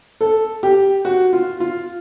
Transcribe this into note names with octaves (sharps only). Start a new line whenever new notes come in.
A4
G4
F#4
F4
F4